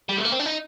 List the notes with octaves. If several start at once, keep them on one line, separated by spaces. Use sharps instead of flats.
G3
A3
A#3
C4
D4
D#4